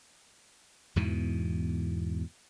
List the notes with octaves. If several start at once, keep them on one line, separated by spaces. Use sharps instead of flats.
E2 G#2 B2 E3